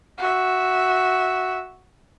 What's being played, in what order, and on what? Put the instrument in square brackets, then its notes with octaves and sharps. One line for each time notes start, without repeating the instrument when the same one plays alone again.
[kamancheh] F#4 E5